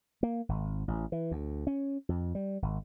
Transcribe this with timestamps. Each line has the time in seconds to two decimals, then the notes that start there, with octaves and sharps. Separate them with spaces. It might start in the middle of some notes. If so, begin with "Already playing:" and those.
0.23 A#3
0.49 G#1
0.88 A1
1.12 E3
1.31 D2
1.67 C#4
2.09 F2
2.35 G3
2.62 G#1